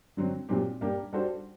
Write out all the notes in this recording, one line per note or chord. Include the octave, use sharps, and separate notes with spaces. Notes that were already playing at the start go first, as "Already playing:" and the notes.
D3 F#3 C4
A#2 F#3 C4 G4
G3 A#3 D4 G4
G3 D4 F#4 A4 C5